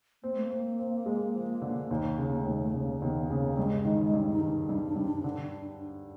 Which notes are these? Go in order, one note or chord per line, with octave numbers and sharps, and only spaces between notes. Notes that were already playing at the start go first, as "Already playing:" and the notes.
A#3 C4
A3
A#3
C4
C4
G#3
F3
D3
D#2 A#3
C#3
A#3
A3
D#2 G#3
A3
C#3 A#3
D#2 B3
C#3 A#3
G2 G#3
D#3
G2
D#4
D#3 D4
G2
G2
D3